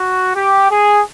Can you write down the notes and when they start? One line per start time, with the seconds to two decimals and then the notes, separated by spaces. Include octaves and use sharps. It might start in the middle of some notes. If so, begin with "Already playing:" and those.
Already playing: F#4
0.35 G4
0.70 G#4